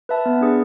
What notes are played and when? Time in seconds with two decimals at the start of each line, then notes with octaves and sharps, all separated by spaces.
0.09 B4 E5 A5
0.26 B3
0.41 D4 G#4 B4